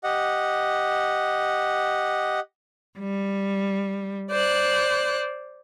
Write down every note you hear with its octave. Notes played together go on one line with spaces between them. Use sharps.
G4 D#5 F#5
G3
C5 D5 F#6